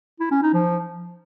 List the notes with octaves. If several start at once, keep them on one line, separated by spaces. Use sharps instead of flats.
E4
C#4
D#4
F3